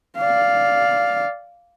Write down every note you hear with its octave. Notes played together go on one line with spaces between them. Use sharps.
D5 F5